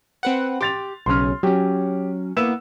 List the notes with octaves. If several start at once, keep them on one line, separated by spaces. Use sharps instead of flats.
C4 B4 F#5
G4 C6 A6 F7
B1 C#3 C#4 C6 F6
F#3 C#4 G4
A#3 B3 E4 E6 E7